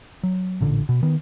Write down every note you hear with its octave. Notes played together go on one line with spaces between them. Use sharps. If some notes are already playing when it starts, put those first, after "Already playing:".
F#3
A1 A#2 D3
B2
D#3 B3